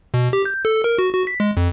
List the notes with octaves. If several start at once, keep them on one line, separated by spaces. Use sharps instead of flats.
B2
G4
G6
A4
A#4
F#4
F#4
B6
G#3
F2